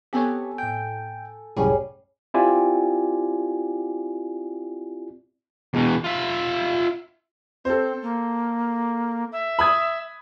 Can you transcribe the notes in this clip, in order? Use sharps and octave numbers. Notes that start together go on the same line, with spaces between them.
B3 C4 G4 A4 C#5 G#5 B6
A2 G5 G6
C2 F#2 A2 G3 C#4 G#4
C4 E4 F4 G4 D5 G#5
E2 B2
F4 E5
C4 A4 C5
A#3
E5
B5 D#6 G#6